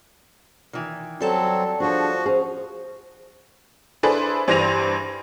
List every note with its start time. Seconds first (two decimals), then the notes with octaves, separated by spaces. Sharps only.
0.73 D#3 E3
1.20 F#3 G3 C4 A4 A5
1.80 F3 D4 F#4 G#4 C#5
2.25 C#4 G#4 C5
4.03 D4 E4 G#4 A4 B4 C5
4.48 G2 E3 C5 A#6 D#7 F7